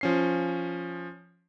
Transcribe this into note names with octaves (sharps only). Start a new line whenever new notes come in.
F3 C#4 C7